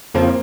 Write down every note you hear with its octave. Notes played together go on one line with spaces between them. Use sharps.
F2 C#3 F3 A#3 C4